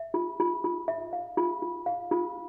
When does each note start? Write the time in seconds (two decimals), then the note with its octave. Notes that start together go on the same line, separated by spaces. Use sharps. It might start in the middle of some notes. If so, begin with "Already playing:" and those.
Already playing: E5
0.14 F4
0.40 F4
0.64 F4
0.88 E5
1.13 F5
1.37 F4
1.62 F4
1.86 F5
2.11 F4